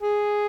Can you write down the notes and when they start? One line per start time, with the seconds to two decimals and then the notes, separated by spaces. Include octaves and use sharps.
0.02 G#4